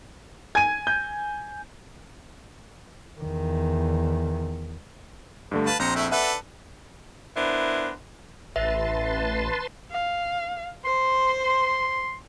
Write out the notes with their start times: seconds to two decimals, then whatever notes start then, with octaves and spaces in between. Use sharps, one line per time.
0.55 G#5 G#6 D#7
0.87 G6
3.20 E2 D#3
5.51 G2 D3 A3
5.67 B4 F5 A5
5.79 A#1 C4 C5 A#5 C#7
5.96 A3 E4
6.12 D4 A4 B4 E5 F#5 F#6
7.36 B3 D4 E4 A#4 C5
8.56 A1 B4 E5 A5 C6
9.91 F5
10.85 C5 C6